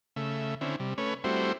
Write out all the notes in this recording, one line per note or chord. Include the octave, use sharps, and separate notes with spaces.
C#3 A3 E5
D3 C4 C#4 E4
C3 G3
A3 C#4 B4 C#5
G3 A3 C4 E4 F#4 C5